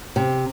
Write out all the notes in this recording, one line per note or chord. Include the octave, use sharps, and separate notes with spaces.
C3